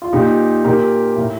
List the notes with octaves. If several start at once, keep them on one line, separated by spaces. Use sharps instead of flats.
F4
A#2 D#4 G4
A#2 G4 A#4
A2